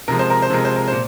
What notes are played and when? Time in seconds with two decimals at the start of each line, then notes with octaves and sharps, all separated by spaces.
0.08 C3 F3 G#3 A#4
0.19 C5
0.30 A#4
0.42 C5
0.50 C3 F3 G#3 A#4
0.65 C5
0.76 A#4
0.88 A#2 C5